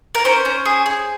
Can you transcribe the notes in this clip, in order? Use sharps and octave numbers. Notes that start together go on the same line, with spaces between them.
A#4
C#4 C5
C#4
G#4
G#4